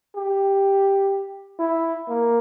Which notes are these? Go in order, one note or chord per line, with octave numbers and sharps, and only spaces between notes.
G4
E4
A#3